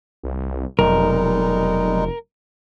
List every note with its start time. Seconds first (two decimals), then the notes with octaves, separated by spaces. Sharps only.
0.23 C2
0.79 F1 B1 G3 G#3 D#4 A#4